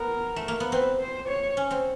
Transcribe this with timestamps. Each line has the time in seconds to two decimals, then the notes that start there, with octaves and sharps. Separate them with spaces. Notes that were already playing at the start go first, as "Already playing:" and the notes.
Already playing: B3 A#4
0.36 A3
0.48 A#3
0.60 B3
0.72 C4 B4
1.00 C5
1.28 C#5
1.57 C#4
1.71 C4